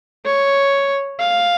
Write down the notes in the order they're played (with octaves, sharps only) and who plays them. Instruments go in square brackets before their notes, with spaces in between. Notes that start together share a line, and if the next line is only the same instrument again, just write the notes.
[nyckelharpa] C#5
F5